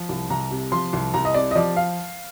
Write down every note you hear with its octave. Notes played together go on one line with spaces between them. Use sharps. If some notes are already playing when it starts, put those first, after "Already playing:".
Already playing: F3
C2
C2 A#5
C3
F3 C6
C2
C2 A#5
D#5
C3 D5
D#5
F3 D5
F5